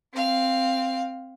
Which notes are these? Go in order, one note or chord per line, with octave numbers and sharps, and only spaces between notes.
C4 F5